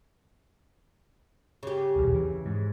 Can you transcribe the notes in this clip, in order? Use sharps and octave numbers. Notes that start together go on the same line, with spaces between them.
C#3 G4
D#1 B1 E2
E3
G#2